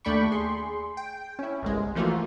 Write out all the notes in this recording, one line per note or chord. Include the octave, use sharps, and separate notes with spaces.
D#2 A3 D4 G5 B5 C#6
G#4 C6
G5
C#4 E4
G1 C2 G#3
E3 F3 A3 A#3 F4 F#4